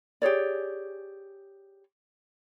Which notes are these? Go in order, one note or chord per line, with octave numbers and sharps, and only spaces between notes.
G4 G#4 C#5 D5